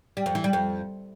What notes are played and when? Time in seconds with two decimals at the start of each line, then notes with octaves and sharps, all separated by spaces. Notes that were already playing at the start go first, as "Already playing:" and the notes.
0.17 G3
0.26 F2
0.35 E3
0.44 G3
0.53 F2